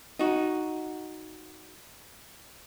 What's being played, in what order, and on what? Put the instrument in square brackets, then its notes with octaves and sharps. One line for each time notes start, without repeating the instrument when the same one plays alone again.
[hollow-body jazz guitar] D#4 F#4